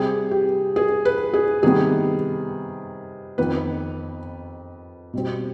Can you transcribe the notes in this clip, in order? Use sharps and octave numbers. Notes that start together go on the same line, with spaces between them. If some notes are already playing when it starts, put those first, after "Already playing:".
Already playing: C3 G3 C4 G#4
G4
G#4
B4
G#4
C3 D#3 G3 B3 G#4
F2 D#3 B3 B4
B2 G3 C4